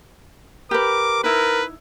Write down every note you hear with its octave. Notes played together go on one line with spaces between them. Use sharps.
G4 A#4 B4 D6
D#4 E4 A#4 B4